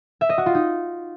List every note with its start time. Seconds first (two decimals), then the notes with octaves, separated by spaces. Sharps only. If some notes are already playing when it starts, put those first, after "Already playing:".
0.21 E5
0.29 D#5
0.38 F#4
0.46 F4
0.55 D#4